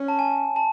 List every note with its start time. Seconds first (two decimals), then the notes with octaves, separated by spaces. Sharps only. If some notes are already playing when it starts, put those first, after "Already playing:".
Already playing: C#4
0.08 A5
0.19 G#5
0.56 A5